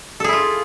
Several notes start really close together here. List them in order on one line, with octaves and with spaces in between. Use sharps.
A4 G#4 E4 F4